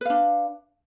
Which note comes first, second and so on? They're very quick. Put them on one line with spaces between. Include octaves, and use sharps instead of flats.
B4 F5 D4